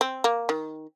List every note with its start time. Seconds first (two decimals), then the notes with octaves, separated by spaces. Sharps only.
0.01 C4
0.24 A#3
0.49 D#3